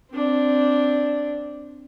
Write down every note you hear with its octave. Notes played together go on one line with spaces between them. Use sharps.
C4 D4